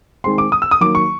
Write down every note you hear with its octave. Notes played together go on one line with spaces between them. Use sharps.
D#3 G#3 C4 C6
D6
D#6
E6
D#6
D#3 F#3 A#3 D6
C#6